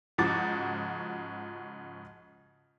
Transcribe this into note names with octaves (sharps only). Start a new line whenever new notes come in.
G#2 C#3 F3 F#4 D6 A6